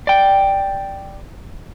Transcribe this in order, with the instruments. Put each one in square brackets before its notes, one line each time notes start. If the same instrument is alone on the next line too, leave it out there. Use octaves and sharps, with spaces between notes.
[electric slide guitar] D5 G5